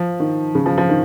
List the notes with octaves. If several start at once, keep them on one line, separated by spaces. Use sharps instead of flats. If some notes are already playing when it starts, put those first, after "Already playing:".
Already playing: F3
D#3
C#3
F3
F3
D#3